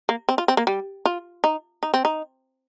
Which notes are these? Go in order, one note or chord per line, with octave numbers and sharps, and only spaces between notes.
A#3
C4
F4
C4
A#3
G3
F4
D#4
D#4
C4
D#4